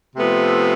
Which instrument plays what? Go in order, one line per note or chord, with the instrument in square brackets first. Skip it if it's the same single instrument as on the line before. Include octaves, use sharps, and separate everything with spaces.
[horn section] C3 F3 A3 B3